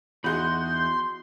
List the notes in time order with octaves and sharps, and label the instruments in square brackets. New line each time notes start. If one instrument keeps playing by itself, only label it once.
[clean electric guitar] E2 [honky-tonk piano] D#4 F#4 G#4 [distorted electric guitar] B5 C6 [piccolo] G6